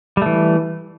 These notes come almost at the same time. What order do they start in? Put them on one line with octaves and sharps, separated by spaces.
G3 A3 E3